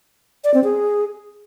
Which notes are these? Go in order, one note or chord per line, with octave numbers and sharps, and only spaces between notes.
D5
C4
G#4